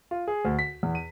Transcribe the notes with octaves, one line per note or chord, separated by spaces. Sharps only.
F4
G#4
D2
B6
E2
D#7